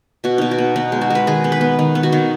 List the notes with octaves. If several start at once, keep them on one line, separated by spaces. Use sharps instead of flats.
B2 F#4
B2 D#4
F#4
B3
B3 D#4
G#3
F#4
G#3 B4
D#3 G#4
B3
B4
B3
D#3
B3
F#4
D#3